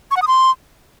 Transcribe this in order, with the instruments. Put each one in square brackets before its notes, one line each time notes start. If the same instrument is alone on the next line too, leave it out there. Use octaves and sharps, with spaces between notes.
[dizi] C#6
F#5
D#6
C6